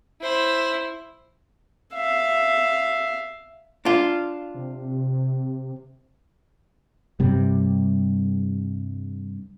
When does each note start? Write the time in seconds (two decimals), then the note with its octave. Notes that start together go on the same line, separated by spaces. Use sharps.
0.21 E4 C5
1.94 E5 F5
3.85 D4 F4
4.55 C3
7.20 G2 C3 G3